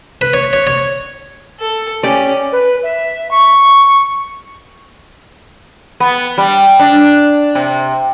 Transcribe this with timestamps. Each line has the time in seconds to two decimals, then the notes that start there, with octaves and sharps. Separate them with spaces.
0.21 B4
0.34 C#5
0.53 C#5
0.67 C#5
1.60 A4
2.03 C#4 G4 D5
2.52 B4
2.83 E5
3.31 C#6
6.00 B3
6.38 G3
6.79 D4
7.55 C3